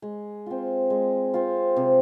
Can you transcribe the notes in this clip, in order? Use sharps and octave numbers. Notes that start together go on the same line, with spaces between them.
G#3
C4 F4
G#3
C4 F4
C3